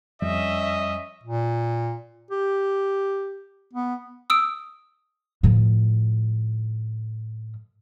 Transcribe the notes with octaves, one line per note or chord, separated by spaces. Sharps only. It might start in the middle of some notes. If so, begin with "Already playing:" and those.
F2 G3 C#4 D#5 E5
A#2
G4
B3
D#6 E6 D7
A2 F3